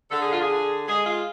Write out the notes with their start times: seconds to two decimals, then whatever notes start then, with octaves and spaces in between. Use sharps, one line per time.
0.10 D3 A4
0.20 G#4
0.30 F4
0.39 G#4
0.48 D3
0.87 G#3 G#4
1.06 F4